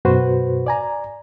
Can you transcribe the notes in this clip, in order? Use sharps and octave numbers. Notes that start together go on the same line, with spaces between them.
F#2 B2 F#4 B4 C5
D5 G#5 A#5